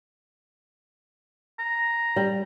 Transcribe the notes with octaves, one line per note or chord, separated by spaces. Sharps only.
A#5
G3